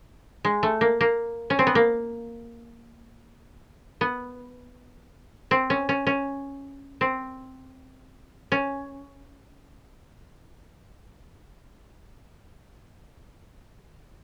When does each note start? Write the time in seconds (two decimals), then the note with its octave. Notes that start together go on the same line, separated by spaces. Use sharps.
0.45 G#3
0.63 A3
0.81 A#3
1.01 A#3
1.50 C#4
1.59 C4
1.67 B3
1.75 A#3
4.01 B3
5.51 C4
5.70 C#4
5.89 C#4
6.07 C#4
7.01 C4
8.52 C#4